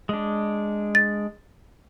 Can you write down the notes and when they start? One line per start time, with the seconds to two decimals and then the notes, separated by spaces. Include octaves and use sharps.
0.09 G#3 D4
0.95 A6